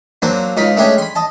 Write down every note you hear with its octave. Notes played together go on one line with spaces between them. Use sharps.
F#3 A#3 C4 D4 C5
C#2 C#3 D#4 F4 B5
G#3 A3 C#4 D4 G4 G#4
B5 C6
D#5 A5